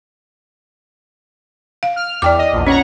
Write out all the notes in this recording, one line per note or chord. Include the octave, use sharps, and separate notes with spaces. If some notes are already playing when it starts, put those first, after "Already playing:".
F5
F6
E2 D5 G5 D6
D#5
A#1 E2
C#4 C#5 F#5 A#5